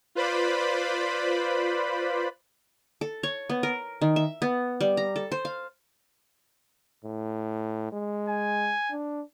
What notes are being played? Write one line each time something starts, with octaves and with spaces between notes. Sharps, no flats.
F4 B4 C5 D5 B5
A4
C#5
B3
A#4
D#3
E5
B3
G3
A#5
A4
C5
F5
A2
G#3
G#5
D4